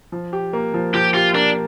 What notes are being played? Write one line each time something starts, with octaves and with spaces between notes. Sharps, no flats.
F3
G4
A#3
F3
F3 G4
F4 G4
A#3 D4